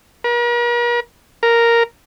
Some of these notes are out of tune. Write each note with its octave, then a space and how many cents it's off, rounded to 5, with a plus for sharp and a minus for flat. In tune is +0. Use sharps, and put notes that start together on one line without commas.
A#4 +45
A#4 +0